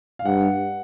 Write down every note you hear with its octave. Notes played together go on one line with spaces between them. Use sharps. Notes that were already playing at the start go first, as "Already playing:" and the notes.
F5
G2 F#5